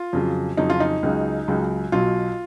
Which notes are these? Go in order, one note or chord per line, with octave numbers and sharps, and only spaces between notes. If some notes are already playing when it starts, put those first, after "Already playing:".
Already playing: F4
F2 C#3 F#3
F2 C#3 F#3 D#4
F4
D#4
C#2 C#3 F#3
C#2 C#3 F#3
B1 B2 F#3 F4